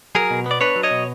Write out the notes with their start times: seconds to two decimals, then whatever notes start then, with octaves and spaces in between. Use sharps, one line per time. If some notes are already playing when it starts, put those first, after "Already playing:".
0.15 F#3 G#4 A#4
0.31 B2
0.46 B3 D5
0.61 D4 B4 C#5
0.76 F#3
0.83 C#5 D#5
0.91 B2